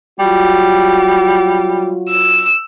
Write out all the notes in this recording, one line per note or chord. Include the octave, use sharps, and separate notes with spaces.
F#3 G3 F4 F#4
E6